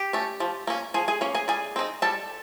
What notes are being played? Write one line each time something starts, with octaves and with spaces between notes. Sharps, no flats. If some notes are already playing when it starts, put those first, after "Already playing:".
Already playing: G4 G5
A3 C#4
F3
A#3 C#4
F3 G#4 G#5
G#4 G#5
A#3 C#4
G#4 G#5
G3 G#4 G#5
C4 D#4
G3 A4 A5